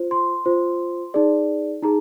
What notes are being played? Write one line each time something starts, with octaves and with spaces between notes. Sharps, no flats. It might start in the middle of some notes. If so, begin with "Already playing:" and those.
Already playing: F4 C5
C6
F4 C5
D#4 G#4 D5
D#4 G#4 A#5